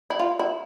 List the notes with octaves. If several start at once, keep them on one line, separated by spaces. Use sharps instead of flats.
E4
F4
E4